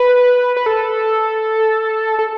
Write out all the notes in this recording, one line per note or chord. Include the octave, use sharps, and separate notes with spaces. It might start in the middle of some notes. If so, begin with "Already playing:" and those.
Already playing: B4
B4
A4
A4